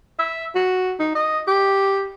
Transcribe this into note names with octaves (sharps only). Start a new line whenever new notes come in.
E5
F#4
D#4
D#5
G4